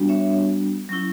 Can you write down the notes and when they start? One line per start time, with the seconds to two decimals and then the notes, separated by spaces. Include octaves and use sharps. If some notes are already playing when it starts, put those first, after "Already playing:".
Already playing: G3 B3 D4 F#4
0.09 C#5 E5
0.89 F#3 C#4 E4